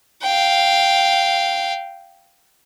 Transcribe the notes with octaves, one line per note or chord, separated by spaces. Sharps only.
F5 G5